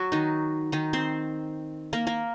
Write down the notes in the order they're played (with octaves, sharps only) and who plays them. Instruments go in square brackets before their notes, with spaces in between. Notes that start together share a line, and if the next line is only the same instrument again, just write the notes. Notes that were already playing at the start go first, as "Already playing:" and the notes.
Already playing: [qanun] F#3 F#4
D#3 D#4
D#3 D#4
C4 C5
A#3 A#4
A#3 A#4